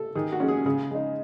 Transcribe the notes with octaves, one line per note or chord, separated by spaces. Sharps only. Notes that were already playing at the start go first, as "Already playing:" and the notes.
Already playing: A4
D#3 G#4
F#4
G#3 C#4
G#4
C#3 G#4
G#3 D#4